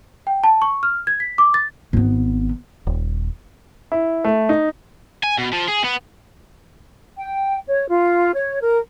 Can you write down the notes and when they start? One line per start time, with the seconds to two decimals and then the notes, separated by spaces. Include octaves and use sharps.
0.27 G5
0.44 A5
0.62 C#6
0.83 F6
1.07 G#6
1.20 B6
1.38 D6
1.54 A6
1.93 G#1 B3
2.87 D#1
3.92 E4
4.24 A3
4.49 D#4
5.24 G#5
5.38 B2
5.53 F3
5.68 G#4
5.85 B3
7.17 G5
7.68 C#5
7.89 F4
8.35 C#5
8.61 A#4